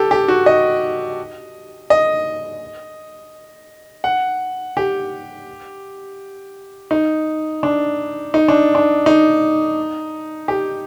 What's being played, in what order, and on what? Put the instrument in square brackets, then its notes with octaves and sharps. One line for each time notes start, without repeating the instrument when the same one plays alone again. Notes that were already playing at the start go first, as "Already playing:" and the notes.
Already playing: [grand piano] G4 A4
G4
F#4
D#5
D#5
F#5
G4
D#4
D4
D#4
D4
D4
D#4
G4